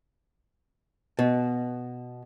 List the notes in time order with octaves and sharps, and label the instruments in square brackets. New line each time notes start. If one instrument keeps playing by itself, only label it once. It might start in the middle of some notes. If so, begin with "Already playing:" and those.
[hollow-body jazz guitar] B2